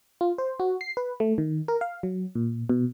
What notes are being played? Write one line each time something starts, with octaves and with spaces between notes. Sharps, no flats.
F4
C5
F#4
C7
B4
A3
D#3
A#4
F5
F#3
A#2
B2